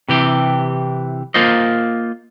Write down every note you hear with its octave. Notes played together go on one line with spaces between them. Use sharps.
C3 E3 G4
A#3 F4 C5 D#5